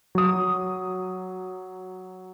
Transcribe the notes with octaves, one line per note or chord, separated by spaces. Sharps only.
F#3 D#6